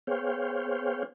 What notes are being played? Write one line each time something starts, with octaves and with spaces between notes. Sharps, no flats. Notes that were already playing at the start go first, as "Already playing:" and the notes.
B3 G#4 C5 C#5 F5 G5